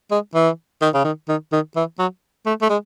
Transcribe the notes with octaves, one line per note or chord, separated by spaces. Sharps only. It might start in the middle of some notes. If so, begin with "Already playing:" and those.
G#3
E3
D#3
C#3
D#3
D#3
D#3
E3
F#3
A3
A3
G#3